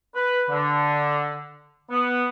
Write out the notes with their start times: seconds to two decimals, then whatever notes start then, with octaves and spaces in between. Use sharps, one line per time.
0.15 B4
0.50 D3
1.90 B3